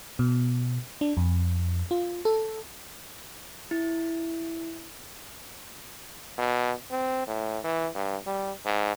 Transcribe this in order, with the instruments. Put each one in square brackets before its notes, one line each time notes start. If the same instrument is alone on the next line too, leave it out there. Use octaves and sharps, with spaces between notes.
[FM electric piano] B2
D4
F2
F4
A4
[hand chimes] E4
[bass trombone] B2
C4
A2
E3
G2
G3
G#2